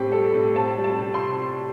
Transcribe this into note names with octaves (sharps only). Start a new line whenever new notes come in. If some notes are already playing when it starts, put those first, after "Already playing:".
Already playing: A2 C4 G4
G3 A4
A2
C4 A5
G3
A5
C3
C6